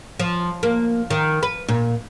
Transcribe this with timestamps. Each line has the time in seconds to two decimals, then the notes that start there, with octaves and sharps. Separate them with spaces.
0.19 F3
0.63 A#3
1.10 D#3
1.43 B4
1.68 A#2